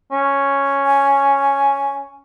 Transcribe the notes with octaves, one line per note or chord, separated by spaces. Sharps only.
C#4
G#5